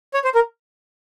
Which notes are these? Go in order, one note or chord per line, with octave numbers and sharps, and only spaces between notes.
C#5
C5
A#4